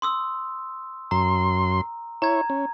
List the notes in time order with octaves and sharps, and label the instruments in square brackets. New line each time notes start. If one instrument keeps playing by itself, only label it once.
[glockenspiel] C6 D#6 E6
[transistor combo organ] F#2 C6 [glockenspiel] A#5
[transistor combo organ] E4 C#5 [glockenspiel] A#5 G#6
[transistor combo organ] C#4